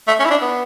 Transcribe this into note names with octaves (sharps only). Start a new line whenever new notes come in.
A3
C#4
E4
D4
B3